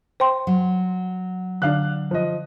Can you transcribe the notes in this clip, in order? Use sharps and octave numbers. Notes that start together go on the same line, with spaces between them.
C5 G5 C6
F#3
D3 D4 F5 F#6
F3 D#5